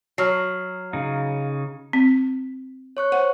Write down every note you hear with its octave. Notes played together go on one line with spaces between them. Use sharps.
F#3 F6 C7
C#3 D#4 F5
C4
C#5 C#6 F#6
C5 F#5